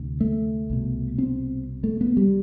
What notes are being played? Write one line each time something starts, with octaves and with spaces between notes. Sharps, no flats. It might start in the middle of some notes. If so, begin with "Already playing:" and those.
Already playing: D2 C3
A3
C2 B2
C4
A3
B3
G3